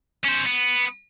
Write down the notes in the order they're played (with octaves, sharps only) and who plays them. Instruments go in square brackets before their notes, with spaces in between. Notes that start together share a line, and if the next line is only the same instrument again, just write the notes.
[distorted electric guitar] C#4 C5
B3